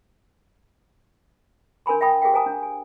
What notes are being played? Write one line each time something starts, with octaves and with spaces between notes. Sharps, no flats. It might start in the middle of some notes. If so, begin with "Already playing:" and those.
D4 A#4 G#5 B5 C6
E5 G5 A5 B5 D#6
G4 G#4 A#4 E5 F5 G5
C5 F5 G#5 A#5 D#6
D4
G#5